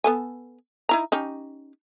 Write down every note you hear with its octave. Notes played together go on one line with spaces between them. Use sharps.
B3 A4 G#5
D#4 E4 A#5
C#4 D#4 G4